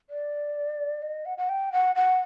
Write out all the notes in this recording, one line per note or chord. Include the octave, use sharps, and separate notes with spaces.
D5
D#5
F#5
F#5
G5
F#5
F#5